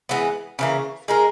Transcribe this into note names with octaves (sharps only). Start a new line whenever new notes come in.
E3 G#3 B3
C#3 E3 A#3
G#3 D#4 A#4